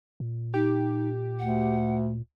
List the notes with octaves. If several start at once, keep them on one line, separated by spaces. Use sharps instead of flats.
A#2
D#4 G4
D2 F#5